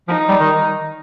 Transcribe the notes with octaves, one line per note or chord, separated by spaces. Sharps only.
F3 D#4
G3
D#3